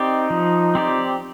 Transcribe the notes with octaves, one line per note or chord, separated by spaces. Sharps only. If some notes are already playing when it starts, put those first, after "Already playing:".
Already playing: C4 D#4 G4 D5
F3
C4 G4 D5